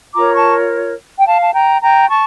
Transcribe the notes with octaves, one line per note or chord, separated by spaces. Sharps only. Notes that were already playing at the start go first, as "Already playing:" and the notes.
F4 A#4 C#5 A#5 D6
A5 C#6
G5
F5 A5
A5
G5 A#5
G5 A#5
A5 C#6